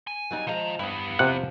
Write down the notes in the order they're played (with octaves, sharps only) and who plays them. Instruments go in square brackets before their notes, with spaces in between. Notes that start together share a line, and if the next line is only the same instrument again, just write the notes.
[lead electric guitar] G#5
[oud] F#3 G3 D#4
[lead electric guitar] D#3 A#5 [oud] F3 G#3
[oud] G2 [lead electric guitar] B3 E4
[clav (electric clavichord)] C3 F#5 [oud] F3